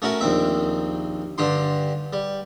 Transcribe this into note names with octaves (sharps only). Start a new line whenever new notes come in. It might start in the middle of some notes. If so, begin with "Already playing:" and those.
A3 C#4 F#4 A#4
A#1 D#2 C4 E5
G2 D3 G4 C6
G3